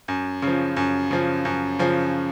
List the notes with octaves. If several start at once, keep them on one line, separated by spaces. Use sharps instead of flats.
F#2
C#3 F3
F#2
C#3 F3
F#2
C#3 F3